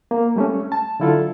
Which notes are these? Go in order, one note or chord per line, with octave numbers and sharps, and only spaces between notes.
A#3
G3 A3 C#4
A5
D3 F#3 E4 F4 A4